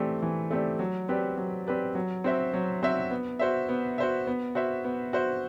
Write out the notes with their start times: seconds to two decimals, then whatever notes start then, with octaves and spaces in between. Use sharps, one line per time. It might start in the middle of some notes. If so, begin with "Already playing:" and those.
Already playing: E3 A3 C4 G4 D5
0.22 E3
0.51 A3 C4 G4 D5
0.79 F#3
1.09 C4 G4 B4 D5
1.38 F#3
1.67 C4 G4 B4 D5
1.95 F#3
2.24 C4 F#4 C5 E5
2.54 F#3
2.83 C4 F#4 C5 E5
3.11 B3
3.39 F#4 C5 E5
3.69 B3
3.98 F#4 C5 E5
4.27 B3
4.55 F#4 C5 E5
4.84 B3
5.13 F#4 C5 E5